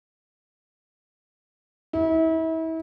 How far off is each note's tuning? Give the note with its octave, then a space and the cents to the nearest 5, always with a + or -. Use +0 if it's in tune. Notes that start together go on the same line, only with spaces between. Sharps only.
E4 -35